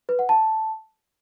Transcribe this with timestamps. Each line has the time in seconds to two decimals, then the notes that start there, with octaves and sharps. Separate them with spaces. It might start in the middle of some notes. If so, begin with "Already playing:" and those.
0.09 B4
0.19 F#5
0.29 A5